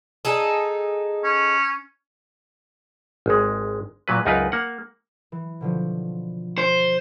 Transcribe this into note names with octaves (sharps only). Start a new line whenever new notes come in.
D#4 G#4 A4
C#4
G#1 G#3
A#2 F#3 B4
C#2 F#2 D#4 F4 A#4 B4
A#3 F#5
E3
B2 D3 F3
C5